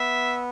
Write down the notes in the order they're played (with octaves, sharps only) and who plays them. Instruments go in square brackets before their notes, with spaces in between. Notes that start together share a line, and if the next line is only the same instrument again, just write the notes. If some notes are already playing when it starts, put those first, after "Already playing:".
Already playing: [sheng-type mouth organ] B3 [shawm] E5